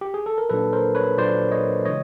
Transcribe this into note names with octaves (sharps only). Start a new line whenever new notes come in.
G4
G#4
A4
A#4
A#2 F#3 A#3 D4 A4 B4
A#4 C5
B4 C#5
A#2 F#3 A#3 D4 C5 D5
C#5 D#5
C#3 E3 G#3 C#5 D#5